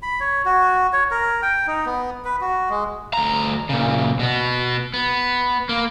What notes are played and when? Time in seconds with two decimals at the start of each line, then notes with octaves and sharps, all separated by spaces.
0.02 B5
0.20 C#5
0.46 F#4
0.93 C#5
1.11 A#4
1.42 G5
1.67 D#4
1.86 B3
2.25 B4
2.41 F#4
2.70 G#3
3.13 D2 A#5
3.69 A#2 C#3
4.19 B2 B3
4.94 B3
5.69 A#3